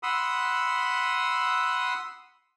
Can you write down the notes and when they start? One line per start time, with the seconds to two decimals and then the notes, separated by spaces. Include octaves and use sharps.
0.03 F#5 B5 C6 D#6 E6